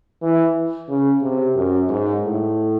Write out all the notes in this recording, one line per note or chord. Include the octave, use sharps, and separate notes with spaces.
E3
C#3
C3
F#2
G#2
A2